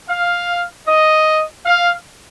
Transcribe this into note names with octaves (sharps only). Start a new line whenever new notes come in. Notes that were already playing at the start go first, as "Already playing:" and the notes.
F5
D#5
F5